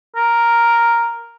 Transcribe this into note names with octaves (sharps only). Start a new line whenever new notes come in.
A#4